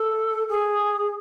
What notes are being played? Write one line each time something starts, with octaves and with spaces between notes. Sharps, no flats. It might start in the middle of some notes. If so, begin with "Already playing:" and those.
Already playing: A4
G#4